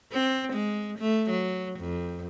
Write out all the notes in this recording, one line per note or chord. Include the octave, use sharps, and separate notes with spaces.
C4
G#3
A3
F#3
F2